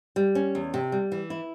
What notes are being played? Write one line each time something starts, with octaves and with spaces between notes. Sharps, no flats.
G3
C#4
E2
C3
G3
E3
E4